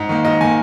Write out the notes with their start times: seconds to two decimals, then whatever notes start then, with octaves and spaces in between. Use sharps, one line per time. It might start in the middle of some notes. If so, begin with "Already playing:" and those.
Already playing: G#2
0.09 D#3 A#3
0.25 G#2 D#5
0.41 D#3 A#3 G#5